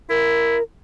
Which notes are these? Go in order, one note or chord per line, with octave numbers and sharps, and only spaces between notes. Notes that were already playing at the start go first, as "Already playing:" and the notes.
E4 A#4